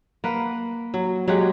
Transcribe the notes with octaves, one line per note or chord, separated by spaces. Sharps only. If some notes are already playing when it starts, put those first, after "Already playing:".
A#3 B4 F#5
F#3
F#3 G#3 G4 F#5